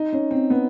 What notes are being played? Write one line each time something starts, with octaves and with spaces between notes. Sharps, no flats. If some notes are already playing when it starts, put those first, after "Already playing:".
Already playing: D#4
C#4
C4
B3